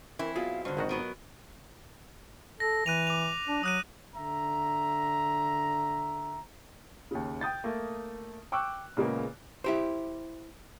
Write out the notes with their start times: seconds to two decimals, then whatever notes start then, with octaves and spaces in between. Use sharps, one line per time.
0.19 E3 C4 E4 A#4
0.36 B2 F#3 F4 G#4 F5
0.65 G2 D3 C5
0.77 G#1 D#3 F#4 B4 D#5
0.89 F#3 B3 A#4
2.60 A4 A#6
2.86 E3 F#6 D#7 F7
3.07 D6 F7
3.48 D4
3.63 F#3 D#6 F#6 D#7
4.16 D3 E5 A#5
7.11 D#2 C#3
7.41 G5 D#6 G6 A6
7.64 A3 A#3
8.52 G5 C#6 D6 E6 F#6
8.97 A#2 C#3 G#3 A#3 B3
9.64 E4 G4 C5